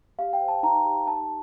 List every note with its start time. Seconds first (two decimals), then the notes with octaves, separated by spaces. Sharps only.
0.19 G4 F5
0.33 G5
0.40 C5
0.48 A5
0.63 D#4 A#5
0.86 G4
1.07 D#4 A5